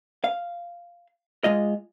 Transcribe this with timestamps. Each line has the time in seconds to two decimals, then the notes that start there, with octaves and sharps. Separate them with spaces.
0.24 F5
1.44 G#3 F4 D#5